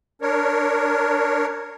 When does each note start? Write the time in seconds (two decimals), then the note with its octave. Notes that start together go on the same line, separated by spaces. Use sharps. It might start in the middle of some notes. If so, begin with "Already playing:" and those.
0.22 D4 A#4 C#5